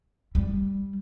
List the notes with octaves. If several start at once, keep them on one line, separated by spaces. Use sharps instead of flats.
G3